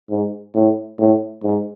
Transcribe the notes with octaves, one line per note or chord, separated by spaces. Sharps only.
G#2
A2
A2
G#2